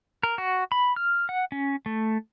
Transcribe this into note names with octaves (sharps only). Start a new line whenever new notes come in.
A#4
F#4
B5
F6
F#5
C#4
A3